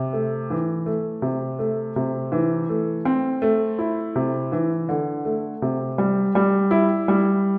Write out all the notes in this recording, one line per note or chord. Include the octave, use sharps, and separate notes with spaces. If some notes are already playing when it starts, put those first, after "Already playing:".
Already playing: C3
A3
E3
A3
C3
A3
C3
E3
A3
C4
A3
E4
C3
E3
D3
A3
C3
G3
G3
E4
G3